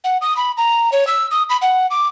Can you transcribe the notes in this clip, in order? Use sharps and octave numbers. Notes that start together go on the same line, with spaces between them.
F#5
D#6
B5
A#5
C#5
E6
D#6
B5
F#5
D6